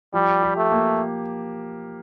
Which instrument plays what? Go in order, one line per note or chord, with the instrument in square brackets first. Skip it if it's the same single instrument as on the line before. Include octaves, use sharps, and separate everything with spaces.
[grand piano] F3 [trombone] G3
[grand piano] G4
[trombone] A3
[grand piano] A#3